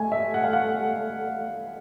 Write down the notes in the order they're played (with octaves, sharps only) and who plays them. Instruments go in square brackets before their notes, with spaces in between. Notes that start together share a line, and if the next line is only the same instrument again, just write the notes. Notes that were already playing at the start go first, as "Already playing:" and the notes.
Already playing: [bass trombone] A3 [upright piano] G#5
[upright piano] E5
F#5
F5
F#5